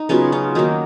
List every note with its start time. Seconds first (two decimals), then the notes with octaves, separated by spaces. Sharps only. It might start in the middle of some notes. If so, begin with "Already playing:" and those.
Already playing: D#4
0.09 C#3 F#3 B3 C#4 F4
0.32 C#4 F4
0.55 D#3 F#3 A#3 D#4